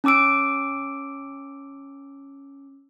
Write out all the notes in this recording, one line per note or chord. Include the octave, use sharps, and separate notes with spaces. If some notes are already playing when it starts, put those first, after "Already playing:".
C#4 A5 D6 E6 D7